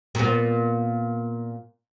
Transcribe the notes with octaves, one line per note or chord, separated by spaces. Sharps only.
A#2 B3